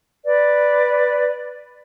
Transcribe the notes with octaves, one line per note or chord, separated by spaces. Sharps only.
B4 D5